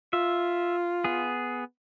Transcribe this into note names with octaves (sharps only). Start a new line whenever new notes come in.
F4 E5
B3 G#4